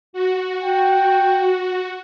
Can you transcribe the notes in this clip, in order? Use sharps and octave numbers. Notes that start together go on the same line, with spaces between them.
F#4
G5